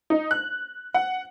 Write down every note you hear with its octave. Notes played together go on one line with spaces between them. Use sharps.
D#4
F#6
F#5